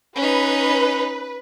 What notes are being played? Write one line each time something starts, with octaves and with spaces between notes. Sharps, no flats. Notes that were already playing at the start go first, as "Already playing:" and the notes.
C#4 D#4 B4